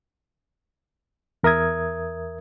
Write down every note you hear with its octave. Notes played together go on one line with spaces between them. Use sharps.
E2 A#4 E5 D#6 G#6